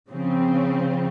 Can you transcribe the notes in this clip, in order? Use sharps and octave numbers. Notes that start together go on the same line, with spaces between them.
C#3 F3 C4